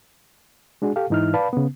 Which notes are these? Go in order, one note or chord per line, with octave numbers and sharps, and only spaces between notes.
G#3 D4 F#4 G#4
G4 A4 F5
G#2 E3 D#4 E4 F6
B4 D5 F5 A5 B5
C#3 B3